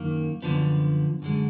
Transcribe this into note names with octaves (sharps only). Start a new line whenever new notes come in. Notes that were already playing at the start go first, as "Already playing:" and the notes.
Already playing: F#2 D#3 A#3
F#2 D3 F3 B3
F#2 D3 G#3